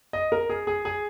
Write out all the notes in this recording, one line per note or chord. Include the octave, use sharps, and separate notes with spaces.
D#5
A#4
G#4
G#4
G#4